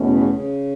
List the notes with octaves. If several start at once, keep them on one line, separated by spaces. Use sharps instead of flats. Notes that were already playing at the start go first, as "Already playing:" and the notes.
Already playing: E2 B2 A3 C#4
C#3 E3
C#3